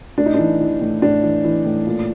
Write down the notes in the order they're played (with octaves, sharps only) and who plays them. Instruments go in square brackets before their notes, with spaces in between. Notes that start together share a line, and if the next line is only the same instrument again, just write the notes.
[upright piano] A2 D4
D#4
E3 D4
E3
A2
A2 D4
E3
E3
A2
A#2